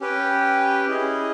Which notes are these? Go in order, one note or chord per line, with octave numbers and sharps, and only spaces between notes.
C#4 G4 B4 G5
C#4 E4 G#4 D#5